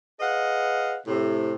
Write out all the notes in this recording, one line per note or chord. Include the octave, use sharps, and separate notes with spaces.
G#4 B4 D#5 F5 F#5
A2 C3